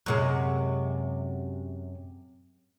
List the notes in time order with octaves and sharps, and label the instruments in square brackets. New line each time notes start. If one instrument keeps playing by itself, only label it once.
[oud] F#2 C3 G#3